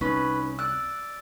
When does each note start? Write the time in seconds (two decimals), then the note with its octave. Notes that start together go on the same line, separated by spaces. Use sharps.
0.01 C2 C#4 D#4 B4
0.59 D5 E6 F#6